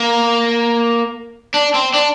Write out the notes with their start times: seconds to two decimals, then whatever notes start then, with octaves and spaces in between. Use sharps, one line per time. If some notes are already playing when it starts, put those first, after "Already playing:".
Already playing: A#3
1.54 D4
1.74 C4
1.94 D4